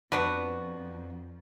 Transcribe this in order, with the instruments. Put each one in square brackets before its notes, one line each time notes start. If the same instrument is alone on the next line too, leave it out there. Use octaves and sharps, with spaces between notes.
[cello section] F2 F3 [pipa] B3 D4 F#4 [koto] B4